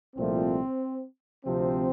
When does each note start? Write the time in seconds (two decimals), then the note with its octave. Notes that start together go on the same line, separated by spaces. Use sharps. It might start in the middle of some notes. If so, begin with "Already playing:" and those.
0.16 C2 A#2 F3 A3 C4
1.44 D2 C3 F3 C4